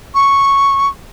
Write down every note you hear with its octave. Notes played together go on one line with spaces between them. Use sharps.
C#6